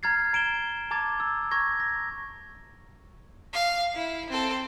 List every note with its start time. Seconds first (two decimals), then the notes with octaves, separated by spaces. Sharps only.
0.03 A#5 F6 G#6 A6 C7
0.33 A#5 D7 E7 G7
0.91 A5 A#5 D6 G#6 A6
1.20 E6
1.51 A#5 C#6 G#6 A#6
1.80 A#6
3.54 F5
3.95 E4
4.30 C4 A4